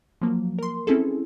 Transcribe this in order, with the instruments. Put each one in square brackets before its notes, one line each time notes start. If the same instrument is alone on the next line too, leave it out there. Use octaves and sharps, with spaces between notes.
[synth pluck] F3 F#3 A#3
A#4 C6
C4 C#4 E4 G#4 A4